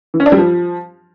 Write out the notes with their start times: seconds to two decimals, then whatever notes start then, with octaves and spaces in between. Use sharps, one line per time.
0.14 E3
0.20 C#4
0.26 D4
0.32 G3
0.38 F3